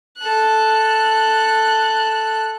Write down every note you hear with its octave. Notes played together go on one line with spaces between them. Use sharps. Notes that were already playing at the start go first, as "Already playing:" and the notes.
A4 F#6